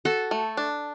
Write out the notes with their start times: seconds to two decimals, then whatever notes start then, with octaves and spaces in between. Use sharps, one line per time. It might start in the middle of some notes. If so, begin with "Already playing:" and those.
0.05 F#4 A4
0.31 A3
0.57 D4